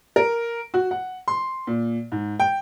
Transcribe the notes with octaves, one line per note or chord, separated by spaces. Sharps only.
A#4
F#4
F#5
C6
A#2
G#2
G5